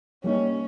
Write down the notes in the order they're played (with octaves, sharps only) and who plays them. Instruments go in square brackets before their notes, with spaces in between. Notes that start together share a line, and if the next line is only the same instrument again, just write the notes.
[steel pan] G3 A#3 D#4 [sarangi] C#4